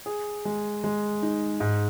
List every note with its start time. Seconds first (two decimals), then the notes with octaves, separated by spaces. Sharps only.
0.06 G#4
0.45 G#3
0.84 G#3
1.22 D#4
1.60 G#2